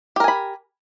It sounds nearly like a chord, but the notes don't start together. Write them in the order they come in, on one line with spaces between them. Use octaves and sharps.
G4 A#4 G#5 B5